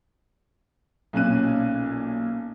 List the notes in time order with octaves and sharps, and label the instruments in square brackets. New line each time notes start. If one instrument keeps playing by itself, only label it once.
[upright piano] B1 A#2 C#4 F#6 D#7